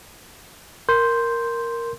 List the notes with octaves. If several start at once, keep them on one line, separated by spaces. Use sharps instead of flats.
A#4 C6 G6